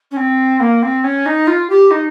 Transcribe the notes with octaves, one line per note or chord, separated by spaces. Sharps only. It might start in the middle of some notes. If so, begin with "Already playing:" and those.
C#4
C4
A#3
C4
C#4
D#4
F4
G4
D#4